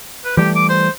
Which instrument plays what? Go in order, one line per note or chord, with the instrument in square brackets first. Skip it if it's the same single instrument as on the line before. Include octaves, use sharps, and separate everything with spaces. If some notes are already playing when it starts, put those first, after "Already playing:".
[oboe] B4
[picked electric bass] E3 G3 A3 [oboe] G4
[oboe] D6
C5